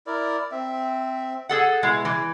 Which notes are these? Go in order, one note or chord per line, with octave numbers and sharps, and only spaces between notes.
E4 A#4 D5
C4 E5
G#4 A4 F#5
B2 G#3 E4
E3